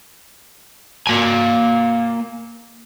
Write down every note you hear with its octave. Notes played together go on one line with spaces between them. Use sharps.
A#3 G#5